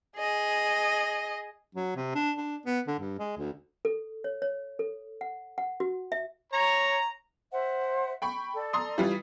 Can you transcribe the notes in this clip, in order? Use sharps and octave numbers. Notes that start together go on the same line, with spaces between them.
G#4 D#5
F#3
C3
D4
D4
B3
D3
G2
G#3
D2
A4
C#5
C#5
A4
F#5
F#5
F#4
E5
C#5 A#5
C5 E5 F#5
G5 B5 C#6
A4 D5
A#5 C6 D#6
E3 G3 F4